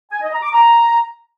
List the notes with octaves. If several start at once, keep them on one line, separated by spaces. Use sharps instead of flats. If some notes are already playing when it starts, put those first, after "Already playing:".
G#5
D#5
A#5
D6
A#5